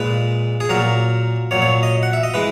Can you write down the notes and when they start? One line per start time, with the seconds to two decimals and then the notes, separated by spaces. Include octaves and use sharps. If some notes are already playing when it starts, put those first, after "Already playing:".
Already playing: A#2 G#3 B4
0.60 G#4
0.69 A#2 F#3 A#4
1.51 A#2 F#3 C#5
1.62 C#5
1.83 D#5
2.03 F#5
2.13 E5
2.23 D#5
2.34 E3 G#3 B4